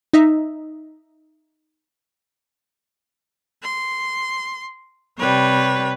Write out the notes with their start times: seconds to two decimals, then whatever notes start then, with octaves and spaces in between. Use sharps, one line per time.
0.13 D#4 D#5 E5
3.63 C6
5.18 C3 G3 B4 C#5